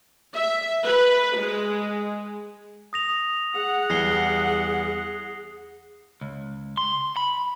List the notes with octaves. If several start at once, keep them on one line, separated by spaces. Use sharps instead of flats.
E5
B4
G#3
D#6 A#6 F7
G#4 F#5 F7
E2 E3 G3 A#6 C7 G7
C#2
C6
B5